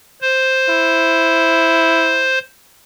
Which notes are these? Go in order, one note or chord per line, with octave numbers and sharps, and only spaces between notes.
C5
E4